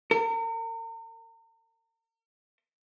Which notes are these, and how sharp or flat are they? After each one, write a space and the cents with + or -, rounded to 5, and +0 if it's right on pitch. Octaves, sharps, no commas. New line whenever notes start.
A#4 -40